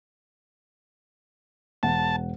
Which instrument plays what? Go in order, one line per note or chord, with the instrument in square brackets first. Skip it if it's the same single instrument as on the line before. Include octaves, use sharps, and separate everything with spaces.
[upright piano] E1 F#5 [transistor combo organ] A5